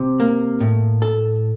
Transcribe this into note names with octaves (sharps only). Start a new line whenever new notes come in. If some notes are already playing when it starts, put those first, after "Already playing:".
Already playing: C3
A#3
A2
A4